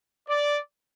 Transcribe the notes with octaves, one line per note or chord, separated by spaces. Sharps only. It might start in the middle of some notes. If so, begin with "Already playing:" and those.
D5